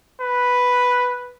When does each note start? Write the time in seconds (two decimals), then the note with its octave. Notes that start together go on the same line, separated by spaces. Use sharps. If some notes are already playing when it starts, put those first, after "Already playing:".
0.20 B4